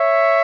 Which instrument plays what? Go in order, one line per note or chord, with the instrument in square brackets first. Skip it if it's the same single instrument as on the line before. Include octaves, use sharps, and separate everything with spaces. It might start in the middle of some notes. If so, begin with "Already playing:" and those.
Already playing: [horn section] C#5 E5